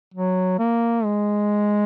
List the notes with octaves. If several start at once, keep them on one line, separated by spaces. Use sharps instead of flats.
F#3
A#3
G#3